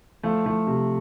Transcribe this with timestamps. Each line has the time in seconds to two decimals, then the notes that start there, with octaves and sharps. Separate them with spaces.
0.23 F3 A3
0.46 F3 A3
0.67 C3